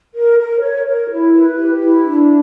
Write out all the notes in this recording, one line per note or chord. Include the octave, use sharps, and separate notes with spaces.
A#4
A#4
C#5
A#4
E4
B4
G4
E4
D4